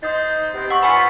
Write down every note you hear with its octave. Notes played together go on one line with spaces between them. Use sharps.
D#4 C5 D#6 G6 A6
C3 B3 C4
F#5 C#6 E6
G2 F4 F#5 G#5 B5 B6 C#7